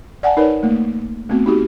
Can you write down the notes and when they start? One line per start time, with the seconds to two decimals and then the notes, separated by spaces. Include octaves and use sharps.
0.23 D5 F#5 G#5 A5
0.37 D#4 A#4 B4 C#5 D5
0.63 A3 A#3
1.30 A3 B3 C4 F#4
1.46 D#4 F#4 G4